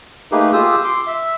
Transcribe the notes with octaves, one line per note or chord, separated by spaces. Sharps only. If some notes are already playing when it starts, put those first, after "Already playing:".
A3 A#3 D#4 G4 G#4 B4
F4 G4 G#4 D#6 E6
C6 D6
E5